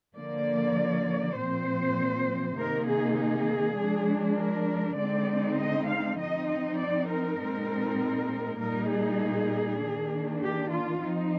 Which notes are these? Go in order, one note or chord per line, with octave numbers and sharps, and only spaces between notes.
D3 F3 A#3 D5
A#2 F3 C4 C5
C3 D#3 A#3 D#4 A#4
G#4
G#4
F3 G#3 D4
A#4
D3 G#3 C4 D#4 D5
D#5
F5
F3 C4 D#4 D#5
D#5
D5
A#4
A#2 G#3 C4 D#4
A#2 G3 A#3 D#4 A#4
G#4
D#3 A#3 D4
G4
F4
F3 C4 D#4